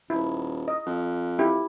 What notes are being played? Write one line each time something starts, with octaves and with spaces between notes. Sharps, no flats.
D#1 E4
D#5
F2
E4 G4